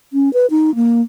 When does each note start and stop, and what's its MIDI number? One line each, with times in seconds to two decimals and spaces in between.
0.13 0.32 61
0.33 0.46 71
0.50 0.74 63
0.75 1.02 58